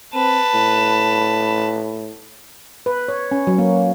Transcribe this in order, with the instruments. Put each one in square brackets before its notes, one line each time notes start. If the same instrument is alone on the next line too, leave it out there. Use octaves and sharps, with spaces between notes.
[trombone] C4 [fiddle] B4 A5
[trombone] A2
[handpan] B4
C#5
C#4
F#3
A#3